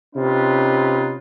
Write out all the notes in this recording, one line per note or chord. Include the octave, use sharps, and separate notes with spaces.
C3 C#4 D#4 F4 B4